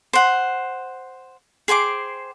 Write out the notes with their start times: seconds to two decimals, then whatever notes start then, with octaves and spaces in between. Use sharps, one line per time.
0.13 C5 F#5
1.68 G#4 C5 G5 D6